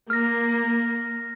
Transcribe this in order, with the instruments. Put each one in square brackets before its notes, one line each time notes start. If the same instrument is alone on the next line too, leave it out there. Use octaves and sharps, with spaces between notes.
[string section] A#3 [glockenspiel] F6 A#6